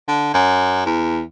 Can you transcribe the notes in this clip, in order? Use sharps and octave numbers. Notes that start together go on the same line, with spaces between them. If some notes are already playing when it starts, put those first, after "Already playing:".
D3
F#2
E2